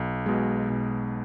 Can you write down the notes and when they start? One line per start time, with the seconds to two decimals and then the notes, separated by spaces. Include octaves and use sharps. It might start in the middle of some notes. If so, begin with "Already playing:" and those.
Already playing: B1
0.26 B2 G#3
0.70 B1